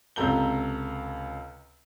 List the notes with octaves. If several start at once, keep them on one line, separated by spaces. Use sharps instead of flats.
C#2 C3 A4 A#5 G6 G7